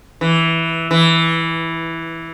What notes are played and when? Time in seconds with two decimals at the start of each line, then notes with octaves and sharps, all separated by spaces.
0.21 E3
0.91 E3